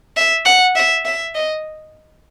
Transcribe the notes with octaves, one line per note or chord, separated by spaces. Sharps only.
E5
F#5
E5
E5
D#5